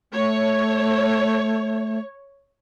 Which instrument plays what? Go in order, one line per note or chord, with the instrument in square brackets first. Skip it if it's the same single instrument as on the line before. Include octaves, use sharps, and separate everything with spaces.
[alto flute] A3 [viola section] C#5